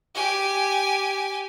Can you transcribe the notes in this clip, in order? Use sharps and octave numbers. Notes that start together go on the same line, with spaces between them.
G4 G#5